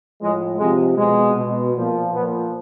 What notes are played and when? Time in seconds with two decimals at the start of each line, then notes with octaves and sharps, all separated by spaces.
0.20 A2 F3 G#3
0.59 C3 F3 G#3
0.97 B2 G#3
1.36 B2
1.75 A#2 F3
2.13 A#2 F3 B3